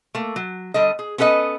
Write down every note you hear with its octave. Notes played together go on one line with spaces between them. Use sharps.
A3 A#3
F#3
D3 G3 A4 D#5
G#4
B3 C#4 A4 B4 D#5